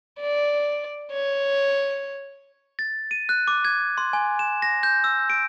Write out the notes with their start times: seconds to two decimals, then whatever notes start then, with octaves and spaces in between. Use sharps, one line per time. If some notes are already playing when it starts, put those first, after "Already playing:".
0.20 D5
1.13 C#5
2.79 A6
3.11 D#7
3.29 F#6
3.48 D6
3.65 G#6
3.98 C6
4.13 G#5
4.39 E7
4.62 A#6
4.83 G6
5.04 E6
5.30 D7